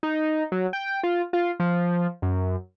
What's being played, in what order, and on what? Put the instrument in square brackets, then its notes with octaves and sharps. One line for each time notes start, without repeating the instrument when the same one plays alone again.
[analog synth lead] D#4
F#3
G5
F4
F4
F3
F#2